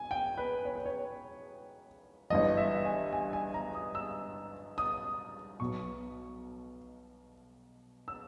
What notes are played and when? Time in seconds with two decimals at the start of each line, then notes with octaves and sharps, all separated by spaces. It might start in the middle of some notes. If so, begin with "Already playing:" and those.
Already playing: G#5
0.11 G5
0.38 B4
0.65 C#5
0.75 B4
0.86 C#5
2.30 G1 G2 E3 D#5
2.57 E5
2.85 G#5
3.13 G#5
3.33 G#5
3.54 A#5
3.75 D#6
3.95 E6
4.78 D#6
5.60 B1 B2 C#6
8.08 E6